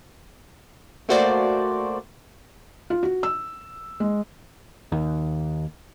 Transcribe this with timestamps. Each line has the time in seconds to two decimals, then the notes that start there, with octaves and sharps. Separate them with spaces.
1.09 A3 A#3 F#4 C5 D5
2.90 F4
3.03 F#4
3.23 E6
4.00 G#3
4.92 D#2